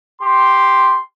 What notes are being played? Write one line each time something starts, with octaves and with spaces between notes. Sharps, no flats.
G4 C6